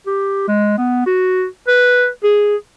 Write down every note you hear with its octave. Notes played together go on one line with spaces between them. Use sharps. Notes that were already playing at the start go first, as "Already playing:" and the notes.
G4
G#3
B3
F#4
B4
G#4